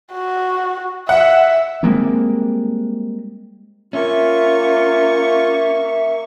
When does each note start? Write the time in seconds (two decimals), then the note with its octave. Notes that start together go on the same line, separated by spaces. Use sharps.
0.12 F#4
1.09 E5 F#5
1.83 G3 G#3 A#3 C4
3.93 A#3 C#4 F4 E5 C#6